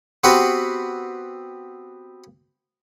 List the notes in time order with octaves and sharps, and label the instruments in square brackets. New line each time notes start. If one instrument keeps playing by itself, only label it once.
[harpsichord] B3 C4 F#4 G4 B4 C5